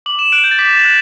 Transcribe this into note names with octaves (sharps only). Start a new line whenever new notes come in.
D6 F#7
E7
F#6 D7 F#7
G6
A6
D6 B6
A6
F#6